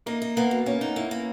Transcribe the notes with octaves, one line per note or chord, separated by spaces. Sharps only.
A#3 D#4
D#4
A#3 B3
B2
A#3 C#4
D#4
A#3 E4
A#3